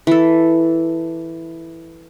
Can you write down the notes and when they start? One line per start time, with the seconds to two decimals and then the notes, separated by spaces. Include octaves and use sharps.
0.07 E3 A4